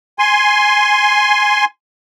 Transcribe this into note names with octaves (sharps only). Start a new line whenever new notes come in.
G#5 C6